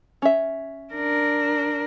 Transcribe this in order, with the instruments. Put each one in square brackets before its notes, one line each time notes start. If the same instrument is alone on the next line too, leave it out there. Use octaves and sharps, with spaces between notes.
[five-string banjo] C#4 E5
[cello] D4 A#4